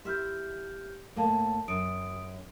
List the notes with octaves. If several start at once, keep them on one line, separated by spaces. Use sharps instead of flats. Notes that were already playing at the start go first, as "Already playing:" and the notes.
E4 G4 E5 F6 G6
A2 A#3 A4 F5 A5
F#2 D#6 D7